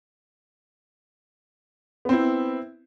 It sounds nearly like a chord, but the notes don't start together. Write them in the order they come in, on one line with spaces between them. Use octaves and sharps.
B3 C4 E4